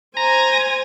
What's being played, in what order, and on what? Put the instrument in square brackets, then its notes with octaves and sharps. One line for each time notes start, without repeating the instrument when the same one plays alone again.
[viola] C5 G#5 [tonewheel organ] A#5 A#6